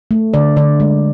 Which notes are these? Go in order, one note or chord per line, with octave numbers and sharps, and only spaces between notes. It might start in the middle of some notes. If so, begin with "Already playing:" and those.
A3
D3 D5
D3 D5
G#3